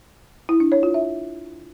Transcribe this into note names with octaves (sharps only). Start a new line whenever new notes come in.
E4
D4
C#5
F4
E5